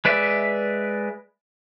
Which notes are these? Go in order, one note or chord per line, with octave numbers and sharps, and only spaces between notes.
G#3 B4 D5 E5